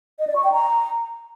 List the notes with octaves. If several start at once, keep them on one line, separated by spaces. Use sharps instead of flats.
D#5
D5
C#6
G5
A#5